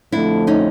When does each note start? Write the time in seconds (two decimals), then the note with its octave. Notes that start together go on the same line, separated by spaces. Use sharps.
0.12 F2 D3 F3 A3 D4 E4
0.47 C#4 D#4